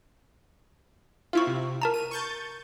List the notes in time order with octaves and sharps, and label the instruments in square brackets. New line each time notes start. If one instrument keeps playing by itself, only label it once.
[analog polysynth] C4 E4 F4 [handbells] F5 C#6
[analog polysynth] C3
[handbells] A#4 A5 A#5
[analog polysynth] D#7
C#6 G6 A6